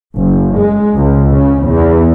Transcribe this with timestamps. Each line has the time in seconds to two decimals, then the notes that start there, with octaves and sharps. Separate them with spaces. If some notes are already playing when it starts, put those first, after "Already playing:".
0.17 F#1
0.58 G#3
0.96 C#2
1.31 C#3
1.68 E2